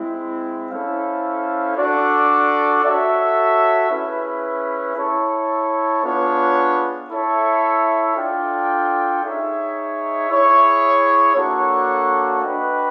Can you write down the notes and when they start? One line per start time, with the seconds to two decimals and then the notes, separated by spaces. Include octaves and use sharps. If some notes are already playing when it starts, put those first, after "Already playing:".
Already playing: G#3 C4 E4
0.70 C#4 E4 A4 C5 F5
1.77 D4 F#4 A4 D5
2.83 F#4 A4 C#5 E5
3.90 C#4 E4 G#4 B4 E5
4.96 E4 A4 C#5
6.03 B3 D4 F4 G#4 C#5
7.10 E4 A4 C#5 E5
8.16 D4 F4 A4 D5 G5
9.23 D#4 G#4 C#5 E5
10.30 E4 G#4 C#5 E5
11.36 A#3 D4 F#4 A4 C#5
12.42 D4 F#4 B4 D#5 G5